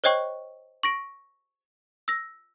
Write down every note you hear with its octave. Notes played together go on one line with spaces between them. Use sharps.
C5 C#5 D#5 G5 C#6
C#6 A#6 D7
E6 A#6